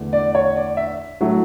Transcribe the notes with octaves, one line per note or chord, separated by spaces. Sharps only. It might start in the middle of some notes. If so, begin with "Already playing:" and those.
Already playing: E2 D3 A3
D5
C#5
D5
E5
A2 F#3 A3